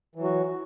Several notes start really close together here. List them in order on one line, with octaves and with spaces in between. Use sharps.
E3 F#3 F#4